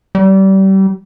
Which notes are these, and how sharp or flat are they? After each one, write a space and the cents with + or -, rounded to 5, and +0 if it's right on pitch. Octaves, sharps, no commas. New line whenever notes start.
G3 -30